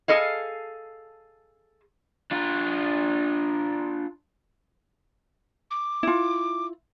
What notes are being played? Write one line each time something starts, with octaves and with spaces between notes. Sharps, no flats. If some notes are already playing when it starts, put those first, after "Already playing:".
G#4 A4 D#5 F5
D4 F4
D6
E4 F4